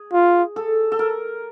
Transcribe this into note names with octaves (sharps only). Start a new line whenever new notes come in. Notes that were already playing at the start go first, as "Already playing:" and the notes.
Already playing: G#4
F4
A4
A4
A#4